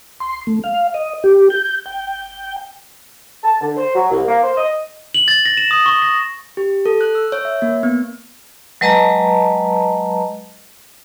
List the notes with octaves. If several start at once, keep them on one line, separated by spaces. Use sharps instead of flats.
C6
A3
F5
D#5
G4
G6
G5
A5
D3
C5
F#3
C2
A#3
C5
D#5
F#7
A6
A#6
E7
D#6
C#6
A#6
G4
A4
F#6
E6
C#5
E5
A#3
B3
F#3 G#3 B4 D#5 A5 A#5